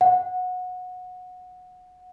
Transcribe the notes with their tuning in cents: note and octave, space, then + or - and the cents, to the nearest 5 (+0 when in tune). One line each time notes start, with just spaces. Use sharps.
F#5 -20